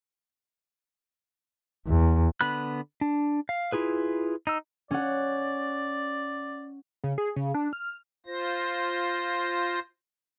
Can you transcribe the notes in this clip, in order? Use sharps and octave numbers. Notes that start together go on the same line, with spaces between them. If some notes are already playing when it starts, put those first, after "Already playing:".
E2
D3 B3 B5 F#6
D4
F5
E4 F4 G#4 B4
D#4 E6
C#4 D5 F#5
C#3
G#4
C#3
D4
F6
F4 C5 A#6